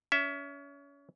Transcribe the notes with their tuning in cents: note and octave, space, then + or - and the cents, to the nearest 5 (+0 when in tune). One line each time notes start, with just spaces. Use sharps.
C#4 +30 E5 +0